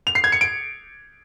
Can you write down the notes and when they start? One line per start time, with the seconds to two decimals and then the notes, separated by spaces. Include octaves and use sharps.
0.07 F7
0.15 C7
0.24 G#6
0.32 C#7
0.41 D7